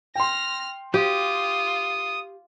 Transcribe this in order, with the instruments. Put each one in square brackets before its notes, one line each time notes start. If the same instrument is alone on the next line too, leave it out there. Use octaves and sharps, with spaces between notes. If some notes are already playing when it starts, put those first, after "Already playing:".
[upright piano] G5 C6 [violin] F6 A#6
[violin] F4 [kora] G4 [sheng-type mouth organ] D#6